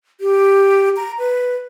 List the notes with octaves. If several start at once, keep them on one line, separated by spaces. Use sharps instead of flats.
G4
A#5
B4